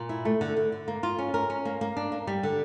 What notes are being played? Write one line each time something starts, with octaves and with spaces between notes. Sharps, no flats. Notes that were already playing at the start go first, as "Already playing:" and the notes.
Already playing: A#2
E4
A3
D3
D3
D3
A#3
F4
C#4
A#4
C#4
A#3
A#3
D4
A#3
G3
D3